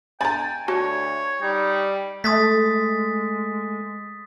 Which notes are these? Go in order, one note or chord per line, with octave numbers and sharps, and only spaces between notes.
G5 G#5 A#5 B5 A6
D2 F#4 C#5 A5
G3 D#4
G#3 A3 D#6 A6 B6